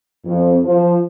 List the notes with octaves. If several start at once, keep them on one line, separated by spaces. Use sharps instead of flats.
F2
F3